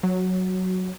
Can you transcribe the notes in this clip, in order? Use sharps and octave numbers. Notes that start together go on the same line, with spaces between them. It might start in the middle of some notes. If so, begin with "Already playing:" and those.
F#3